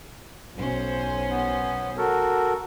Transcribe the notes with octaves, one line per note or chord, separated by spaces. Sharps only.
B1 C#4 C5
B3
F#4 A4 A#4